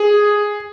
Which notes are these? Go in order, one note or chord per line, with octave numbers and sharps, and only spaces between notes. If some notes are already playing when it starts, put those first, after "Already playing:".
Already playing: G#4